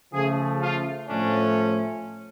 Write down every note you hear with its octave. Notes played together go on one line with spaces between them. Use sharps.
C#3 F3 A3 G#4
F4
A2 F3 A3 C#4 D4